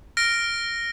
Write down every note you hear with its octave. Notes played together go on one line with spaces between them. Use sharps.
F6 A#6 D7